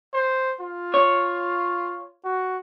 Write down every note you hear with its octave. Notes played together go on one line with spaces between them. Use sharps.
C5
F4
C#5
F#4